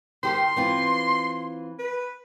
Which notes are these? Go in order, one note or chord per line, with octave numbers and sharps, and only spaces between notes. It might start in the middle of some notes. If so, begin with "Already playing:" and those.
D#3 G4 C6
E3 C4 F4
B4